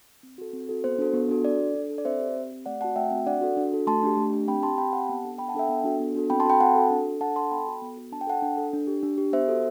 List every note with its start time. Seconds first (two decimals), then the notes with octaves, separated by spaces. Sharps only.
0.23 C4
0.38 F#4 A4
0.53 C4
0.69 F#4 A4
0.84 B3 C5
0.98 D4 F#4 A4
1.14 B3
1.29 D4 F#4 A4
1.45 D4 D5
1.59 A4
1.75 D4
1.90 A4
1.98 D5
2.05 C4 C5 E5
2.20 G4
2.36 C4
2.51 G4
2.66 A3 D5 F#5
2.81 C4 F#5 A5
2.84 F#4
2.96 A3 E5 G5
3.11 C4 F#4
3.26 D4 D5 F#5
3.41 F#4 A4
3.57 D4
3.72 F#4 A4
3.87 A3 A5 C6
4.03 D4 G4
4.17 A3
4.33 D4 G4
4.48 C4 G5 B5
4.63 G4 A5 C6
4.78 C4 G5 B5
4.93 G4 F#5 A5
5.09 B3
5.24 D4 A4
5.38 B3 G5 B5
5.48 F#5 A5
5.55 D4 A4 E5 G5
5.69 B3
5.84 D4 F#4 A4
6.00 B3
6.15 D4 F#4 A4
6.30 C4 G5 B5
6.40 A5 C6
6.46 F#4 A4 G5 B5
6.60 C4 F#5 A5
6.75 F#4 A4
6.90 D4
7.06 A4
7.21 D4 F#5 A5
7.36 A4 A5 C6
7.51 B3 G5 B5
7.67 F#4 A4
7.82 B3
7.97 F#4 A4
8.12 D4 A5
8.21 G5
8.27 A4 F#5 A5
8.42 D4
8.58 A4
8.73 D4
8.87 G4
9.03 D4
9.18 G4
9.33 B3 C5 E5
9.48 F#4 A4